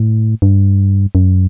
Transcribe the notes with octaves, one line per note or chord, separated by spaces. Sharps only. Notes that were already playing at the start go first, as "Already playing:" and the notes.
Already playing: A2
G2
F#2